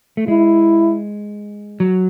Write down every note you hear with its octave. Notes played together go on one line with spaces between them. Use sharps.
A3
G#3 E4
F#3